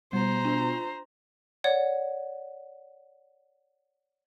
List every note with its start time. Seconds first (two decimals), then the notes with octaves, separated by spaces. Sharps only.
0.13 B2 G3 C5 A#5
0.45 D4 F4
1.64 C#5 D5 F#5